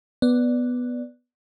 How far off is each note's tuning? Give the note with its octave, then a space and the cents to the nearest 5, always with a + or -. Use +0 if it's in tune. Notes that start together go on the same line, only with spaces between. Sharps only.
B3 +0 D5 +0